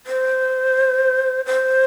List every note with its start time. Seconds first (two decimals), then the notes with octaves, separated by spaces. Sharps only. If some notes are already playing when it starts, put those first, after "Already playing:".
0.07 C5
1.46 C5